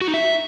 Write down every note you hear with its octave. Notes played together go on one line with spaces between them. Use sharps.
F#4
D#4
E5